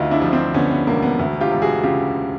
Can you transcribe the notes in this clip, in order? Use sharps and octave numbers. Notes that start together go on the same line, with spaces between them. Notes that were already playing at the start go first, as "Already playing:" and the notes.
Already playing: D2 D#4 F4
D4 E4
F3
C4 D4
D3 B3 C#4
B3
E1 A#3
B3
D2
F4 G4
E1
F#4 G#4
C#3 F4 G4